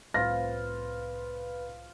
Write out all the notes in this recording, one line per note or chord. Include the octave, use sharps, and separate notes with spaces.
C2 A2 C4 F4 B4 C5 A#6